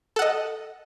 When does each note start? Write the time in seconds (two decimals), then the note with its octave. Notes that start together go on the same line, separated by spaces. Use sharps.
0.16 A4
0.19 F#5
0.22 D#5